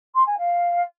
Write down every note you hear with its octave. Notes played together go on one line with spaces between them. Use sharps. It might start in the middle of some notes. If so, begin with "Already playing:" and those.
C6
G#5
F5